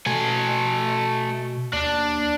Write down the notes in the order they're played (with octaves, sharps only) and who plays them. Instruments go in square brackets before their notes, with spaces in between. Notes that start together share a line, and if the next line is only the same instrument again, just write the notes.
[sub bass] B2 [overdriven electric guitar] A3 G#5
[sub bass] D#2 [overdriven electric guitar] D4